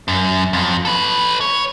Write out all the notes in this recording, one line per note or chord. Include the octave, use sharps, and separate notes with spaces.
F#2
F2
A4 B4
C#5